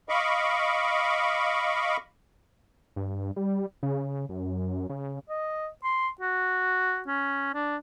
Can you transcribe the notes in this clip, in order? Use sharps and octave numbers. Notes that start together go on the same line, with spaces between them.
D#5 F5 B5 C#6 D6
G2
G3
C#3
F#2
C#3
D#5
C6
F#4
C#4
D4